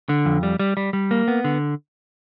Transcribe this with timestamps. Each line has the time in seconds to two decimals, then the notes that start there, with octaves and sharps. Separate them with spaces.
0.09 D3
0.25 F2
0.43 G3
0.60 G3
0.77 G3
0.93 G3
1.11 A#3
1.28 B3
1.44 D3